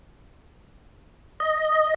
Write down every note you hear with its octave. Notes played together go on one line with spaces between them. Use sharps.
D#5